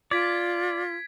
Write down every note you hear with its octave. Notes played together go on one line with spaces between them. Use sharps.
F4 D5 G#6 B6 D7